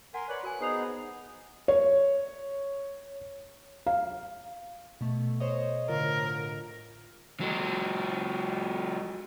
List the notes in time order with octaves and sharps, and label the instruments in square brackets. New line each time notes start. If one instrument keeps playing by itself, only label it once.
[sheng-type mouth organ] A#4 G#5 C6 [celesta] F#5
[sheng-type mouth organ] B4 C#5 D5 [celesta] F#6 F#7
[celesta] F#4 A#4 G#5 [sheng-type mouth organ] F#6
[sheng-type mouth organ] B3 D#4 G#4 [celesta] C5 C7 F7
[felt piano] C#5
F5
[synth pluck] B2 A3
C5 C#5 D#5
[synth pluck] A2 D3 F4 [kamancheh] A#4
[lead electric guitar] F#3 G#3